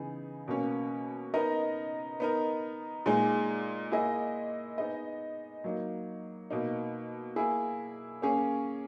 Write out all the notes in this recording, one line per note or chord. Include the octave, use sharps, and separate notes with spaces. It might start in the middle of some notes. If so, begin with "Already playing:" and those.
Already playing: C#3 E3 B3 D#4 G#4
B2 A#3 C#4
B3 D#4 A#4 D#5
B3 D#4 A#4
A#2 G#3 D#4 G#4
A#3 E4 G#4 D#5
B3 D#4 G#4 D#5
F#3 A#3 D#4
B2 A#3 D#4
A#3 E4 G#4
A#3 C#4 G#4